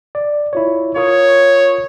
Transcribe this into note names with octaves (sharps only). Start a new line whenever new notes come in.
D5
E4 F4 C#5
F4 A#4 C#5 D#6